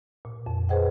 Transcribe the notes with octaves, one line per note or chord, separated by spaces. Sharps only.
A#2
F2
G#4 B4 C5 D#5 F#5 G5